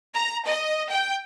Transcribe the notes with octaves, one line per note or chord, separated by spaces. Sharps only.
A#5
D#5
G5